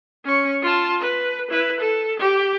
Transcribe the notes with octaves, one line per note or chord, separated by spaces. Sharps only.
C#4 C#6
F4 A5
B4
E4 B4
A4
G4